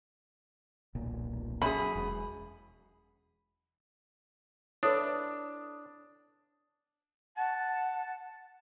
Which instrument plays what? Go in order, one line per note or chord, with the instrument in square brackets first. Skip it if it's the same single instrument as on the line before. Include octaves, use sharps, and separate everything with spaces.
[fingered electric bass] D#1 B1 A#2
[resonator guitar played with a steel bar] F#2 G#4 [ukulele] B5
[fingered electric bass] E1
[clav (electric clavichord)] D4 [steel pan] E4 A4 B4 [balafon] C#5 [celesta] D#6
[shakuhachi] F#5 [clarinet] A5